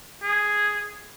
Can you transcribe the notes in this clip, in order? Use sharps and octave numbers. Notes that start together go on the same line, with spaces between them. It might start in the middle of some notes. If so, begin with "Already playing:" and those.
G#4